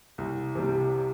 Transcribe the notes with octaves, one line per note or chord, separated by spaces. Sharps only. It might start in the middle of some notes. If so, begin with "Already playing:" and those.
C2
C3 G3